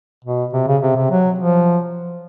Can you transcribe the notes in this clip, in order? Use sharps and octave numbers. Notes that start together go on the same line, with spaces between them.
B2
C3
C#3
C3
C3
F#3
F3